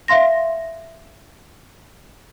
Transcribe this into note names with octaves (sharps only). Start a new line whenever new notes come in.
E5 F5 C6 A#6